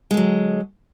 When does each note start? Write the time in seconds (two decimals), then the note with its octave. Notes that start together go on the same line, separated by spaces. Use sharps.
0.11 G#3
0.14 D3
0.17 F#3